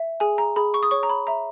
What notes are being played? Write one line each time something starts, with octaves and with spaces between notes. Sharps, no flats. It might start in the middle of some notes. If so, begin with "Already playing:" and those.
Already playing: E5
G#4 G#5
A#5
G#4 B5
C#6
D#6
C#5 C#6
A#5
B5
E5 A#5